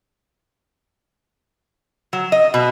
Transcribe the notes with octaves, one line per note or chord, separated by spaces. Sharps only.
F#3
D#5
B2